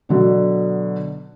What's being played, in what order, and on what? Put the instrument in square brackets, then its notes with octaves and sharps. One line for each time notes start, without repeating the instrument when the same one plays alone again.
[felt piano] B2 D3 F#3